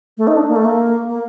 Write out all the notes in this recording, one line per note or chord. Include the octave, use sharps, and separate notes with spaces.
A3
D#4
D4
A#3
A3
A#3
A#3